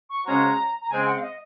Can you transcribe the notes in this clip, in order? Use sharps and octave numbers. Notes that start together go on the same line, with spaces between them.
C#6
C#3 G#3 C#4 F#4 C5 A#5
A#5
C#3 G#3 C4 G#5
F#5
F5
D#5